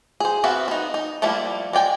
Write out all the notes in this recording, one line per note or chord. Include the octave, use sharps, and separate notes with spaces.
G#4 C5
B3 C4 F#4 E5 F5
B3 D#4
D#4
F3 G3 A3 A#3 E4
G#3 D5 G5 G#5